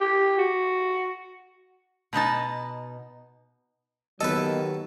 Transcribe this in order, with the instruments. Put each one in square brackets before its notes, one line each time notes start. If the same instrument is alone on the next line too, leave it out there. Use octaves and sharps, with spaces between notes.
[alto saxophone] G4
F#4
[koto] B2 B3 D#4 A5
[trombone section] D#3 F#3 [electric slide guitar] A#3 B3 D#5 [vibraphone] G4 [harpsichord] A4 B4